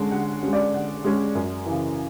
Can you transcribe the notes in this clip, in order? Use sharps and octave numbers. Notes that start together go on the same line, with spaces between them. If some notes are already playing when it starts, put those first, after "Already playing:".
Already playing: D3 G#3 C#4
D3 F#5
G#3 C#4
D5
D3 F#5
G#3 C#4
F#2
C#3 E3